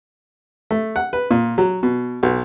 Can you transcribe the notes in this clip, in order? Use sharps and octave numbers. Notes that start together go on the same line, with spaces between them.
A3
F#5
B4
A#2
F#3
B2
B1